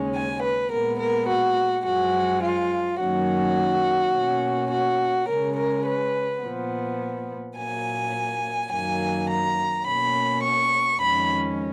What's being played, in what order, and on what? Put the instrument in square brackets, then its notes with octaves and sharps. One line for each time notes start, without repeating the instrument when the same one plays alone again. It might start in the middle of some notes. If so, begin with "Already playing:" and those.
Already playing: [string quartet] D#2 C#3 G#3 C#4
G#5
B4
A#2 G#3 B3 A#4
A#4
F#4
F#2 F3 G#3 F#4
F4
F#2 D#3 F#3 A#3 C#4 F#4
B2 A#3 C#4
F#4
C#3 G#3 C#4 A#4
A#4
B4
A#2 F3 B3
A#2 F#3 A#3 G#5
F#2 D#3 F#3 A#3 G#5
A#5
B2 A#3 C#4 B5
C#6
F2 D#3 G#3 C#4 B5